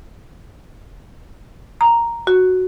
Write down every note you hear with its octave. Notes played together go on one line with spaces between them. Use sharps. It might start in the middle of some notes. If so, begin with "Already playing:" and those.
A#5
F#4